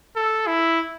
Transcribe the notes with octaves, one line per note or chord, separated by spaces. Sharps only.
A4
E4